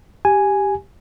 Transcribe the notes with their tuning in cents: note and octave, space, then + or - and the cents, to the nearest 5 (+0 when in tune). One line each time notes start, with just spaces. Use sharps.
G4 +0 G#5 +0